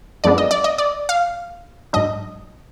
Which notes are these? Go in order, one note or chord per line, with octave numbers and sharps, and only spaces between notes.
F#2 F3 G#3 B3 D4 D5
D#5
D5
D#5
D5
F5
G#2 F#3 D4 D#5